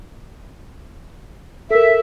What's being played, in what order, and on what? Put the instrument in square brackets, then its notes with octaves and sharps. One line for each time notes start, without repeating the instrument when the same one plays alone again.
[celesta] A4 A#4 [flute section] E5